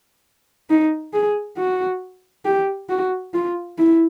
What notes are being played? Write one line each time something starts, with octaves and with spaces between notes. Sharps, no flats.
D#4
G#4
F#4
G4
F#4
F4
E4